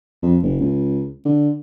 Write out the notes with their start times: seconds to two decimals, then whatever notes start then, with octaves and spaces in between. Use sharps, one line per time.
0.22 F2
0.43 F#1
0.61 C#2
1.25 D3